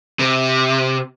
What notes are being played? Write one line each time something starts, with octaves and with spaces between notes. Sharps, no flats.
C3